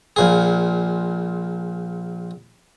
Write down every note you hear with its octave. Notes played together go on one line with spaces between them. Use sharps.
A#1 A#2 G#4